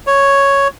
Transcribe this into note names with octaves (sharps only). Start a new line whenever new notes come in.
C#5